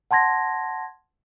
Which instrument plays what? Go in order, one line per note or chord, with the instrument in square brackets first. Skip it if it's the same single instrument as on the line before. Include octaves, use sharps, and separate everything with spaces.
[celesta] F#5 A5 C6 G#6 A#6